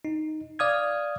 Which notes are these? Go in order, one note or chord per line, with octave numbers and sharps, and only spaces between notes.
D#4
D5 F5 D#6 F6 G#6